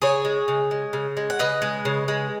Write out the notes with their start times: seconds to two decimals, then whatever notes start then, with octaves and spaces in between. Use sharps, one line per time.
0.02 C#3 G#4 C#5
0.25 G#3
0.48 C#3
0.71 G#3
0.93 C#3
1.17 G#3
1.30 F#5
1.39 C#3 B4 D#5
1.62 G#3
1.85 C#3
2.08 G#3